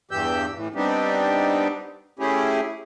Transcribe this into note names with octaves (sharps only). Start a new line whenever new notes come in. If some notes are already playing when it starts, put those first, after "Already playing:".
E2 G2 E3 G4 E6 G6
A2 E3
G3 B3 C4 D4 D#4 G4
A3 C#4 E4 G4 G#4